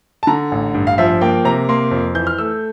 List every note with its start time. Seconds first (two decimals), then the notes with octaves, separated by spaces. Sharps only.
0.23 A5
0.27 D3 A#5
0.52 A1
0.74 G2
0.87 F5
0.98 F3 E5
1.21 A#3 G5
1.45 C3 A#5
1.69 A#3 C6
1.91 F2
2.15 E3 G6
2.27 F6
2.38 A3 E6